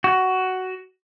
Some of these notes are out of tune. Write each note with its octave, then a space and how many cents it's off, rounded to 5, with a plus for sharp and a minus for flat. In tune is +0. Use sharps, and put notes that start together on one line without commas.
F#4 +10